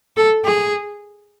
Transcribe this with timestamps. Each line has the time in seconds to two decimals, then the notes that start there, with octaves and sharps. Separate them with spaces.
0.17 A4
0.45 G#4